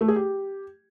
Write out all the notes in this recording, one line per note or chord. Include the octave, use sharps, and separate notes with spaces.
A3
G#4
G4